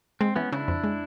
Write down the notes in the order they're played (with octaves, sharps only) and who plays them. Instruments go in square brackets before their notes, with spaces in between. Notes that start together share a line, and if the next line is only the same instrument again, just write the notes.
[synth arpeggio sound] G#3 [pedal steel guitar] C4
[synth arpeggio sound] E3 [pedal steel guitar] B3 C#4
[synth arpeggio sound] C#3 [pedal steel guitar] D4 E4
[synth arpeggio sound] F2
G#3